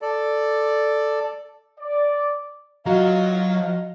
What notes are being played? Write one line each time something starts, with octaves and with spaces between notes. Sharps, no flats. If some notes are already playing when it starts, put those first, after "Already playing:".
A4 D5
D5
F#3 F4 F#4 D#5 F5 A#5